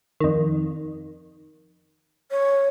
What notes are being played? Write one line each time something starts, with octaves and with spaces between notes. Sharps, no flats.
F2 D#3
C#5